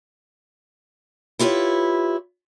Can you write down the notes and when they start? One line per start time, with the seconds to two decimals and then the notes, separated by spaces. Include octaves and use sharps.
1.39 E4 F4 G4 B4 C#5